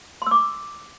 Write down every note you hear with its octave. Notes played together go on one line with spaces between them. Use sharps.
C6 D6 E6